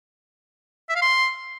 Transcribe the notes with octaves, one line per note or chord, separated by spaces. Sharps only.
E5
F5
C6